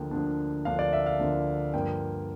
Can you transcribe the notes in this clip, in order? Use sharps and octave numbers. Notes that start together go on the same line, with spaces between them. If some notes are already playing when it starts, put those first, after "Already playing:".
Already playing: D2 D3 F3 A#3 D4 G5
D2 D3 F3 A#3 D4
D2 D3 F3 A#3 D4 F5
D5
E5
F5
D2 D3 F3 A#3 D4
G2 D3 F3 A#3 G5